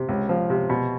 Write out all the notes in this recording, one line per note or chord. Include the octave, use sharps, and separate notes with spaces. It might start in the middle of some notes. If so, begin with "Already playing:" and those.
Already playing: C3
C#2
F3
C3
B2